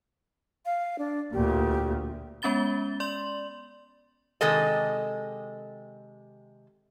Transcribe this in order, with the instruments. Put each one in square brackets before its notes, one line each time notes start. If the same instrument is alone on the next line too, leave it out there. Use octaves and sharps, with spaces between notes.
[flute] F5
D4
[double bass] D2 A#2 [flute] G4
[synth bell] G#3 B3 C#4 B5 A6 G7
D5 C6 F#7
[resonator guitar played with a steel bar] C3 D#3 G#3 A4 D#5